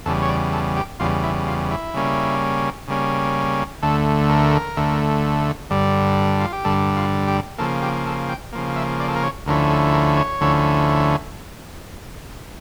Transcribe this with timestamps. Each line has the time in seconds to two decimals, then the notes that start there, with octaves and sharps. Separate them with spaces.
0.06 E2 C#3 G3 A4
0.22 C#5
0.29 D5
0.53 A4
0.77 G4
1.00 E2 C#3 G3 F4
1.24 E4
1.48 F4
1.71 E4
1.94 C#3 G3 A#3 C#4
2.88 C#3 G3 A#3 C#4
3.82 D2 D3 A3 A4
4.29 A#4
4.76 D2 D3 A3
5.70 G2 D3 G3
6.40 F4
6.53 G4
6.64 G2 D3 G3 A4
6.96 F4
7.28 G4
7.58 C#3 F3 A#3 A4
7.82 G4
8.06 A4
8.29 G5
8.53 C#3 F3 A#3
8.76 E5
9.00 D5
9.08 A4
9.16 A#4
9.23 C#5
9.46 D2 D3 F3 C#4 E4 A#4
9.71 A4
9.93 A#4
10.17 C#5
10.41 D2 D3 F3 C#4 E4